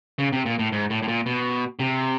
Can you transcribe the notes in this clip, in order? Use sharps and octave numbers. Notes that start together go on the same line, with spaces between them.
C#3
C3
A#2
A2
G#2
A2
A2
A#2
B2
C3